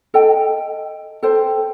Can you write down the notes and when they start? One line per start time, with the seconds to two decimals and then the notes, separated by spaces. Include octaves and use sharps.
0.14 A4 D#5 G5
1.23 A4 C5 G5